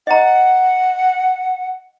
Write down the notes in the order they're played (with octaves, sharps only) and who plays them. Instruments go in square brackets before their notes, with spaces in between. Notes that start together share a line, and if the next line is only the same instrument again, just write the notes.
[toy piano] D#5 A#5 [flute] F#5